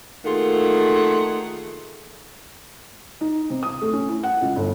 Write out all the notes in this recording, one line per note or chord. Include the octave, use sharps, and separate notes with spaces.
D#3 A3 A#3 F4 G#4 F#5
D#4
C3
D#6
A3
C#4
E4
F#5
C#2
G1